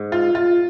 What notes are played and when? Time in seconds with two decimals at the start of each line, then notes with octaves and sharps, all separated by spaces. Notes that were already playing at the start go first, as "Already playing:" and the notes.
Already playing: G#2
0.12 F4
0.35 F4